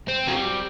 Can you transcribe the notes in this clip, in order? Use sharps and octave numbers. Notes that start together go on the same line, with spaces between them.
C4
F#3
G3